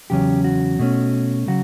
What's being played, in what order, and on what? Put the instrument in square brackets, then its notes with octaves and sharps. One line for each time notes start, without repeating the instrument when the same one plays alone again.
[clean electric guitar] E2 C#3 F#3 C#4 G4
F#4
B2 A3 C#4
C#3 F#3 F#4